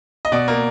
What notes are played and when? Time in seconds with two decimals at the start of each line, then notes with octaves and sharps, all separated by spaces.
0.25 D#5
0.32 B2 D5
0.48 A#3